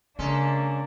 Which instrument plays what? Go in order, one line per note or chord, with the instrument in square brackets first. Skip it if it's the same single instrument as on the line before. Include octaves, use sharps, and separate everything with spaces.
[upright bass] C#3 [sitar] G#3 C#4 A4 [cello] A#3 D4